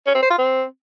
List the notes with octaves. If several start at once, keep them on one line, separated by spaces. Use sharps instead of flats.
C#4
C4
C5
F4
C4